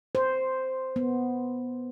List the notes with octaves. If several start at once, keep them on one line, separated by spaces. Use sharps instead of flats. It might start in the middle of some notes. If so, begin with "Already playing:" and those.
C5
B3